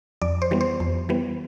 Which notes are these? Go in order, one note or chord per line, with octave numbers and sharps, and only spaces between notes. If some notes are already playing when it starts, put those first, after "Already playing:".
F2 D5
C5
E3 G3 B3
C5
F2
E3 G3 B3